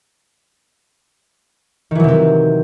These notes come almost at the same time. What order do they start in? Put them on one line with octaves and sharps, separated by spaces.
D#3 E3 F#3 C3 C4